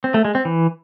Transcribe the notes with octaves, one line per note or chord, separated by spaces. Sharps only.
C4
A3
G#3
C4
E3